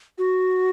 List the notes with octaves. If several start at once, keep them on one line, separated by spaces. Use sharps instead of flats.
F#4